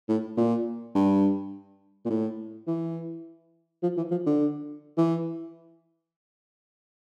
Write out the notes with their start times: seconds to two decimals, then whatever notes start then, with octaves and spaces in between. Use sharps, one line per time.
0.09 A2
0.37 A#2
0.95 G2
2.05 A#2
2.10 A2
2.67 E3
3.83 F3
3.97 E3
4.11 F3
4.26 D3
4.98 E3